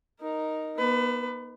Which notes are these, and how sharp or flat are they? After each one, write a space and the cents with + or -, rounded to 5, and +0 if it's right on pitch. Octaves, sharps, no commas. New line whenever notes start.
D#4 +0 A#4 +0
B3 -40 B4 +30